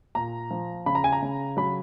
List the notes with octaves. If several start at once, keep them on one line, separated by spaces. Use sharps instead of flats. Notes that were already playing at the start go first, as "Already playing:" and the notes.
A#2 A#5
F3
C#3 B5
A#5
G#5
A#5
C#3
F#3 B5